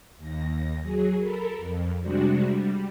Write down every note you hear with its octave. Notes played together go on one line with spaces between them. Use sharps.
D#2 A#6
F#3 G#4
A4 A#4 B5
F2
C3 G3 G#3 D4 F#4
G3